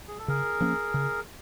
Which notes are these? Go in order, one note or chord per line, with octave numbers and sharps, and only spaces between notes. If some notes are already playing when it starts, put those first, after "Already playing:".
G#4
A4
C#3 G#4 A#4
F3 A#3 C#4
C#3